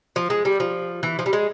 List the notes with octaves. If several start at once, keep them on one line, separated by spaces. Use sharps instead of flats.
F3
G#3
G3
F3
E3
F3
G3
G#3